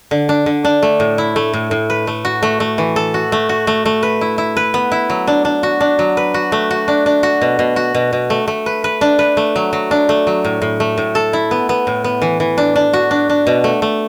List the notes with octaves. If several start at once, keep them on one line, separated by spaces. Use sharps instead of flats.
D3
D4
D3
D4
A3
A2
E4
A3
A2
A2
B4
A3
F#4
A3
A3
E3
A4
F#4
A3
F#4
A3
A3
B4
E4
E4
B4
B3
E4
F#3
D4
D4
F#4
D4
F#3
B4
F#4
A3
F#4
D4
D4
F#4
B2
B2
F#4
B2
B2
A3
A3
B4
B4
D4
B4
A3
F#3
F#3
D4
A3
F#3
A2
A2
A3
A2
A4
E4
B3
B3
A2
B3
E3
E3
D4
D4
F#4
D4
D4
B2
A3
A3